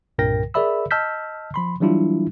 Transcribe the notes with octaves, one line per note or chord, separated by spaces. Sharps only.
C2 G2 A#2 A#4 G5 A#6
G#4 A#4 D5 E5 B5 E6
D#5 A5 E6 F6 G6 B6
F3 B5 C6
E3 F#3 G3 D4 E4 F4